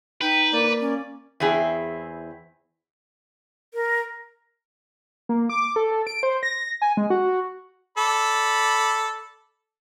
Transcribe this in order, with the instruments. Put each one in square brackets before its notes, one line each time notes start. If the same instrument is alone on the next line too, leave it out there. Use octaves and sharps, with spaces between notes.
[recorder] D#4 [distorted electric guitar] B4 [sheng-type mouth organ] G5
[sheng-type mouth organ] A#3 D5
[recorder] C#4
[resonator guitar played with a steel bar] E2 C4 E4 G#4
[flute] A#4
[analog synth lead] A#3
D6
A4
A4
D7
C5
A#6
G#5
G#3
F#4
[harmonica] A4 D5 B5